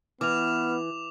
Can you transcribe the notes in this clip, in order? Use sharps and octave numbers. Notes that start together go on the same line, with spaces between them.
E3 B3 D6 F6 F7